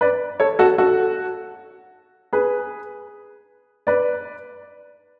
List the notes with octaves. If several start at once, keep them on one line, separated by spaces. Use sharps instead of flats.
B4 D5
A4 C#5
F#4 A4
F#4 A4
G#4 B4
B4 D5